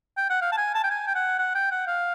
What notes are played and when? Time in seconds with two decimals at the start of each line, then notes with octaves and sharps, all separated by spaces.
0.17 G5
0.30 F#5
0.41 F5
0.52 A5
0.57 G#5
0.75 A5
0.84 G5
0.91 G#5
1.07 G5
1.15 F#5
1.39 F#5
1.55 G5
1.71 F#5
1.87 F5